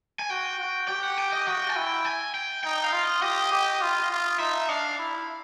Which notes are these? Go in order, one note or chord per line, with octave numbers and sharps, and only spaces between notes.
G#5
F#4 G5
F#4
G4 G5
F#5
G5
D#5
F#4 G5
G#5
E4 G5
G#5
G5
D#4 G5
F5
F4
D#5
G4 D#5
G4
F4
F4
D#4 E5
D4 F5
E4